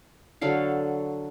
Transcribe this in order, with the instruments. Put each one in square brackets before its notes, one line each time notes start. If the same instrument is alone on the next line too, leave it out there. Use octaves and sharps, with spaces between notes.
[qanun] D3 F#3 A4 F5